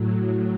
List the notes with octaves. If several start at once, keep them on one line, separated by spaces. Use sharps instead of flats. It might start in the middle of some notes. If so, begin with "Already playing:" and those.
Already playing: A2 F#3